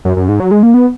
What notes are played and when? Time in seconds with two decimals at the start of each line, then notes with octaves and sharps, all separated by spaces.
0.05 F#2
0.17 F#2
0.29 G#2
0.40 F#3
0.51 G#3
0.63 A#3
0.74 B3